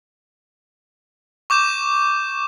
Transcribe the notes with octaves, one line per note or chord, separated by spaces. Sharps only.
C#6 D6 G6 E7